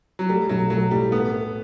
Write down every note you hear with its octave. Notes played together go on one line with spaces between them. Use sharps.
F#3
G3 A3
B1 F#3
F#3 A3
A2 G3
A3 B3
A3